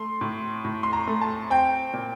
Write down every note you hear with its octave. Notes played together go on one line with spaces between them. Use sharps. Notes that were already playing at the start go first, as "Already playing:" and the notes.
Already playing: A3 C6
A2
A2
C6
A#5
A3
A5
C4 G5
A#2